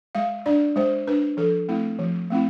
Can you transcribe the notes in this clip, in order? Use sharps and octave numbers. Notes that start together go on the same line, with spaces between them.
G#3 F5
D4 D5
G#3 C5
D4 B4
F3 A4
A3 C4 E4
F3
A3 C4 E4